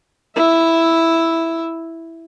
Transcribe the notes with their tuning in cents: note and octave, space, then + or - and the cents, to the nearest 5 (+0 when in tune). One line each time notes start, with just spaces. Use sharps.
E4 +0 E5 +0